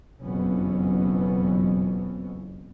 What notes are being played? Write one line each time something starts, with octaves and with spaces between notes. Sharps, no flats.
F#1 F2 B2 E3 B3 C#4